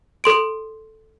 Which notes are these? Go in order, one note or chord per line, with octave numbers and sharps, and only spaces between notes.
A4 C6 D7